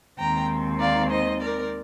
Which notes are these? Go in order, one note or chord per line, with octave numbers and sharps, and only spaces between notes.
D#2 D#3 G#3 C4 G5 A#5
D5 F5
C5 D#5
A#4 D5